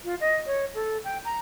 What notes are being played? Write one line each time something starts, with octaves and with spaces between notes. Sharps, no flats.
F4
D#5
C#5
A4
G5
A#5